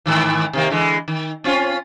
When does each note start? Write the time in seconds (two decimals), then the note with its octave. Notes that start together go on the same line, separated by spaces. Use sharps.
0.06 G#2 D#3 E3
0.53 C3 D#3 A#3
0.70 D3 E3 G#3
1.08 D#3
1.44 C4 C#4 F4